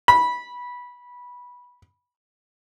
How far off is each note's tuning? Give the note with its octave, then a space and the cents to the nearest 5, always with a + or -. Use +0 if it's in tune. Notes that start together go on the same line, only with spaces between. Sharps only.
B5 -15